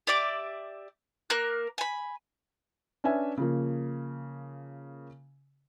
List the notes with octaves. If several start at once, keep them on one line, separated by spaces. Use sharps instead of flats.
G4 D5 E5 D6
A#3 A#4 F#6
G#5 B5
C#4 D4 B4 E5 G#5
C#3 F3 A#3